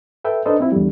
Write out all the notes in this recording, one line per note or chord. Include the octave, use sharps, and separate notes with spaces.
A4 B4 E5 G5
D4 D#4 A4 B4 C5 D#5
C4 E4 F4
E2 D3 G3